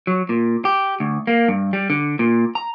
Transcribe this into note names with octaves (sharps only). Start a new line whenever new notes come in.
F#3
A#2
G4
D2
A#3
G2
G3
D3
A#2
A#5